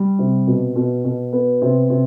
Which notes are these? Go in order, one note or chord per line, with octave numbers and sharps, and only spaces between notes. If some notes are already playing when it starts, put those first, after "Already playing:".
Already playing: G3
C3
B2
B2
B2
B3
C3
C3